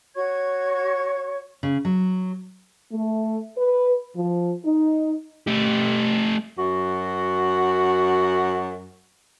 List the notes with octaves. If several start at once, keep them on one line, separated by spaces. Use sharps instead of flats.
F#4 C#5 C#6 G#6
C#3
F#3
A3
B4
F3
D#4
A3 G4
F#2 F#4